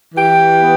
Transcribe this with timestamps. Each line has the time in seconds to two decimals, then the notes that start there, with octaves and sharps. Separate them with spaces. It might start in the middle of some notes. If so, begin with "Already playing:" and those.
0.15 E3 G4
0.60 B3